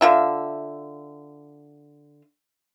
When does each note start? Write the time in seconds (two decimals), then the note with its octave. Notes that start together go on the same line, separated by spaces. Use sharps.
0.01 D3 F4 E5